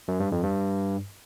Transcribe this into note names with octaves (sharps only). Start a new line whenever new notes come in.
F#2
G2
F2
G2